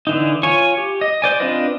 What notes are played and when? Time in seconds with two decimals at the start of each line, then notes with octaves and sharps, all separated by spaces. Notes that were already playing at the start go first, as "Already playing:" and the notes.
0.07 D3 E3 D#4
0.43 F4 C#5 G#5 C#6
0.77 G4
1.01 D#5
1.22 C5 D5 G#5
1.40 C4 D4 F4 B4 D#5